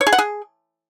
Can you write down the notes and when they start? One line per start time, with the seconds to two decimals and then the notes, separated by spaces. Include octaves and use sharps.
0.01 C#5
0.07 G#4
0.13 F#5
0.18 G#4